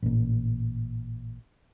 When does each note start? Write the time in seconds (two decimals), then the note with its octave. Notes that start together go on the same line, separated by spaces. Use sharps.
0.02 A1 A#2